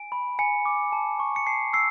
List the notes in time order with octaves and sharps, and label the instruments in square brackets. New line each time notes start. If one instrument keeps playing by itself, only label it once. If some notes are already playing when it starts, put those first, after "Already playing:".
Already playing: [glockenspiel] G#5 D7
B5
G#5 C#7
D6
A5
C#6
C#7
A5 C7
E6 C7